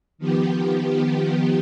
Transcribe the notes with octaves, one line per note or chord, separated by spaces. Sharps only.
D#3 F3 B3 G4